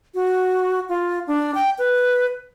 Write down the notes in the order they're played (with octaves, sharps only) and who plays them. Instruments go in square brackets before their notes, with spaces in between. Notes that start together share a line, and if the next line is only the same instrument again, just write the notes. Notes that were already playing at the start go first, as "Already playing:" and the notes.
[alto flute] F#4
F4
D4
G5
B4